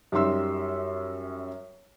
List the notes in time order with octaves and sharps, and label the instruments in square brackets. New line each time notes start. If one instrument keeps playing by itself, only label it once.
[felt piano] F#2 G3 D#4 E5 C6 E6